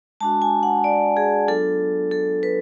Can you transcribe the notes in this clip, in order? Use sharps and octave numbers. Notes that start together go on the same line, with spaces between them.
G#3 D4 F#4 A5
G#5
F#5
D5
G#4
F#3 B3 D4 F4 A4
A4
B4